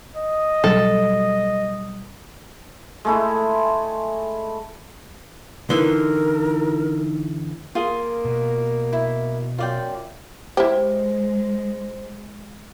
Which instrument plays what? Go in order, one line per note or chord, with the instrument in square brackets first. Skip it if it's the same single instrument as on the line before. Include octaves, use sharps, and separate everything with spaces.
[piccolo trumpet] D#5
[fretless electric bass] B2 F#3 G3 [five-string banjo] A4
[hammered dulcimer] G#3 A3 E4
[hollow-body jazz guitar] D3 E3 [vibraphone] D#4 E4 [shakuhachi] A#4
[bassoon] A#3 [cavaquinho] F4 G#4
[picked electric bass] B2
[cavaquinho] E4
[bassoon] F#2 [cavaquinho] F4 D5 G5
[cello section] G#3 [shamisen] E4 G4 [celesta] C5